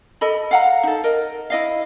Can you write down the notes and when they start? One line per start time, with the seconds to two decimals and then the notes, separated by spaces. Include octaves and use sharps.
0.21 A4 D#5 B5
0.51 F5 F#5 A#5
0.83 D#4 A4
1.04 A#4 D#5
1.50 E4 D#5 F5